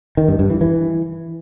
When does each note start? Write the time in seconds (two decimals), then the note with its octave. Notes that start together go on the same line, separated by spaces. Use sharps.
0.17 D#3
0.28 G2
0.39 G2
0.50 E3
0.61 E3